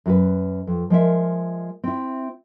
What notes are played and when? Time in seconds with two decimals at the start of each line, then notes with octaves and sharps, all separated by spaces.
0.06 F#2 F#4 B4
0.67 F2
0.90 F3 G#3 A#4 E5
1.84 C4 E4